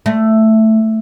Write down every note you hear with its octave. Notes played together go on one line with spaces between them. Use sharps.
A3